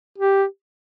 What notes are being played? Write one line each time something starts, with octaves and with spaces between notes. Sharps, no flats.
G4